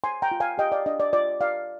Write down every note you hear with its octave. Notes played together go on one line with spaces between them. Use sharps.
C5 G#5 C6
G5 A#5
F4
F5 G#5
G4 D#5 G5
D5 F5
D4 D#5
D5
F4 D5
F4 D5 F5